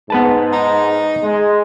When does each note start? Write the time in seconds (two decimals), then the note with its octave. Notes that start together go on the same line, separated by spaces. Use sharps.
0.10 G#2 B3 B4 A5
0.53 D#4
1.24 G#3